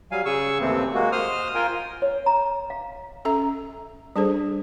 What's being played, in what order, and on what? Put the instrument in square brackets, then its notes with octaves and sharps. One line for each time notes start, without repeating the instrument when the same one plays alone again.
[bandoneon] F#3 G3 F5 G#5
C#3 G#4 C#6 E6
D#2 A2 C3 E3 C4
G#3 A#3 F#4
C5 D#6 F6
F4 A#4 G5 G#5
[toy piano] C#5
A#5
F5
[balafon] C#4 A4 E5 A#5
G3 D4 G#4 A4 C5